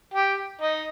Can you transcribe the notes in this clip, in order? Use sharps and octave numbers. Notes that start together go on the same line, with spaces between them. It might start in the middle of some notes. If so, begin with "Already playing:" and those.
G4
D#4